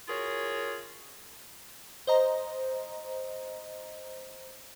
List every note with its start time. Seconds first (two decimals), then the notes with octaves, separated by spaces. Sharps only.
0.08 F4 F#4 G#4 A#4 C#5
2.07 C5 D#5 A#5